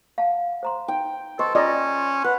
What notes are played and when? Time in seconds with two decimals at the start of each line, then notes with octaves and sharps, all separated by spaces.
0.18 F5 F#5 A5
0.63 C5 A#5 C6
0.88 D#4 G5
1.39 A4 B4 C5 D#5 C#6
1.55 C#4 F4 D5 D#5 A#5
2.24 B4 F#5 B5